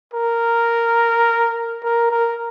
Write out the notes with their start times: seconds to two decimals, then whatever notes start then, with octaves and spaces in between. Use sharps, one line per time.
0.14 A#4
1.83 A#4
2.11 A#4